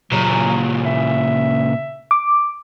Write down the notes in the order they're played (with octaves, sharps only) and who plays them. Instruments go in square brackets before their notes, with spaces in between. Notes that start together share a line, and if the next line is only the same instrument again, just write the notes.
[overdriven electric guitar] A#2 C#3 [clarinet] F#3
[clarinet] E5
[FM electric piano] D6